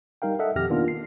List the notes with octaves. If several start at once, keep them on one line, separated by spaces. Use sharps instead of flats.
G3 D#4 A#4 F5 G5
A4 D#5 E5 F#5
F2 B2 D#3 G4 F6 A#6
D#3 A#3 B3 D4 F4
C7